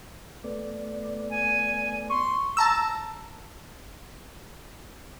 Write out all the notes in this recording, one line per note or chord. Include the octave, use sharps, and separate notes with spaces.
A3 B3 D5
G#5
C6 C#6
A5 A#5 E6